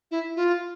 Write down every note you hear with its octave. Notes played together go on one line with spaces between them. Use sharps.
E4
F4